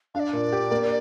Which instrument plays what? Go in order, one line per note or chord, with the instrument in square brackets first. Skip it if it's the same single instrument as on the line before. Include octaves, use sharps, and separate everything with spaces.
[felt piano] D4 [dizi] F5
[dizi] D5
[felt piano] A#2
G4
A#3